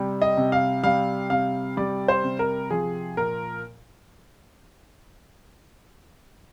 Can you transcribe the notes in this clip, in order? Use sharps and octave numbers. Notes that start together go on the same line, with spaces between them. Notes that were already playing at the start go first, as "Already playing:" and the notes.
Already playing: C3 G3
D#5
C3
F5
G3 F5
C3 F5
G3 D5
C5
C3
A#4
F3 G#4
A#2 A#4